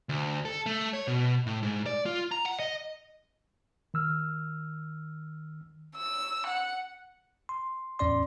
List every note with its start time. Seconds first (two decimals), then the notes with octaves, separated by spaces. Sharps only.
0.09 D2
0.45 A4
0.66 A3
0.93 C#5
1.08 B2
1.46 A2
1.63 G#2
1.86 D5
2.06 F4
2.31 A#5
2.46 F#5
2.59 D#5
3.94 D#3 E6 F6
5.96 E6
6.47 F#5
7.49 C6
7.99 E2 A2 C#4 D5 C6